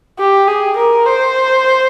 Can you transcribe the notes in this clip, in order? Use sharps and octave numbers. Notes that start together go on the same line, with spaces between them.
G4
G#4
A#4
C5